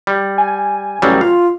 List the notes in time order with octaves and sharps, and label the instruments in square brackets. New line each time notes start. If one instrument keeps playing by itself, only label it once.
[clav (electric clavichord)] G3
[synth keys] G#5
[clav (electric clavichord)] A1 F#3 G3
[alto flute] F4 [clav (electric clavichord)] F5